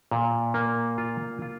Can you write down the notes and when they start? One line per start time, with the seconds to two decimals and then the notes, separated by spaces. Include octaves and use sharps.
0.11 A#2
0.54 A#3
0.98 F4
1.42 F4